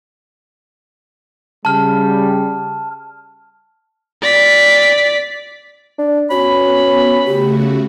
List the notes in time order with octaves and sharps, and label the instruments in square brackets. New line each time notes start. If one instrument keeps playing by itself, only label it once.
[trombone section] C#3 G3 [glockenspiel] A5 F6
[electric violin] D5 B6
[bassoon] D4
[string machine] B3 [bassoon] C#4 [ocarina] F#4 [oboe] B5
[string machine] C#3 A3 F#4 [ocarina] G4